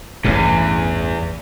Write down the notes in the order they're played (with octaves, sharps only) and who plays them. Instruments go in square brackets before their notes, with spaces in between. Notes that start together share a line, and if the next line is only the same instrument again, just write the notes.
[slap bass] A1 G2 E3 [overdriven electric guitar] E2